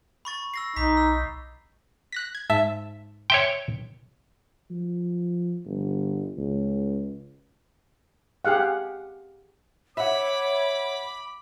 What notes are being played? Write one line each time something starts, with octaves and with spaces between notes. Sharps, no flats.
B5 C#6 A6
E6 A#6 C7
B1 D#4 A#5 D6 B6
E6
F#6 A#6 B6
G#6
G#2 E5 A5
C#5 E5 G5 C6
F3
G1
C#2
G4 G#4 F5 F#5
C#5 E5 F#5 B5 D6